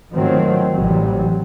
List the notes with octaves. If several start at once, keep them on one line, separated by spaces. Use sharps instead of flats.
G#2 D#3 F3 F#3 A3 C4
A1 C3 E3 F#3 G3